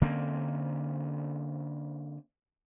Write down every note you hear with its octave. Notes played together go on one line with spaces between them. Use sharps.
D3 A#3 C4 C#4